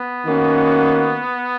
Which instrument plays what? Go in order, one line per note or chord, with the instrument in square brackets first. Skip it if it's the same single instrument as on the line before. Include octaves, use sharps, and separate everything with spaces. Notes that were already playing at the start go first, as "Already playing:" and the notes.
Already playing: [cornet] B3
[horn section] D#3 A#3 C#4 F#4